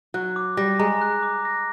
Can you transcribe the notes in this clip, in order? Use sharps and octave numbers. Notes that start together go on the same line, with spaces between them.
F#3 F#6
D6
G3 A#6
G#3 A#5
F#6
D6
A#6